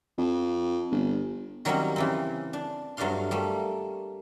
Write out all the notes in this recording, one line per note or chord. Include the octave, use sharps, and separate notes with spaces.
F2
G1
D#3 F#3 G3 A#3 C4 C#4
C#3 E3 C4
D4
G2 F#3 A3 D4 F5 C6
G3 A3 A#3